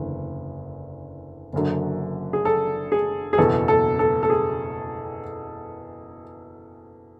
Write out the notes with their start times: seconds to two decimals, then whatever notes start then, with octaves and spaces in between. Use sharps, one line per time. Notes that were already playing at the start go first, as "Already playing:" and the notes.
Already playing: F#1 E2 D3
1.53 F#1 F#2 D3 F#3
2.33 G#4
2.45 A4
2.92 G#4
3.33 G#4
3.37 F#1 E2 B2 A4
3.68 A4
3.99 A4
4.23 A4
4.30 G#4